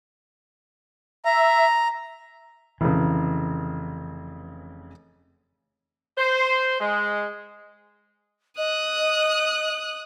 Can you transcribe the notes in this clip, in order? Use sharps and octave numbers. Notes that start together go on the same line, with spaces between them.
E5 A#5
F1 C#3 E3
C5
G#3
D#5 D#6 F#6